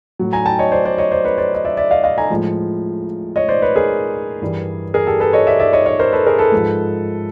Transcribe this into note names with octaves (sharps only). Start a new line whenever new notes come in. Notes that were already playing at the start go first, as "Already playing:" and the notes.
A2 F#3
G#5 A#5
G5 A5
C#5 D#5
C5 D5
C5 D5
C#5 D#5
C5 D5
B4 C#5
C5 D5
D#5
D5 E5
D5 E5
D#5 F5
D#5 F5
G#5 A#5
A2 F3 G#3
C#5 D#5
C5 D5
B4 C#5
G#4 A#4
G2 E3 G3
G#4 A#4
G4 A4
A4 B4
C#5 D#5
D5 E5
D5 E5
C#5 D#5
C#5 D#5
A#4 C5
A4 B4
G#4 A#4
A4 B4
G#2 F3 G#3